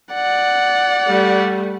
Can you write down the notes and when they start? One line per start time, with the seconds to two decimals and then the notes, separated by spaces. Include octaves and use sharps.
0.13 D5 F#5
1.08 G3 A3